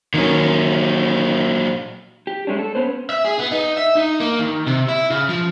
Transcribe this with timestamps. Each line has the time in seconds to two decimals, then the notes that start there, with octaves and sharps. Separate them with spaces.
0.14 A#2 D#3 F#3 C#4
2.27 G4
2.47 G#3 A3 C#4 D4
2.59 A4
2.75 B3 C#4 B4 C5
3.10 E5
3.25 G#4
3.39 B3
3.51 D#4
3.77 E5
3.95 D#4
4.20 A#3
4.39 D#3
4.67 C3
4.89 E4
5.10 C#3
5.29 F3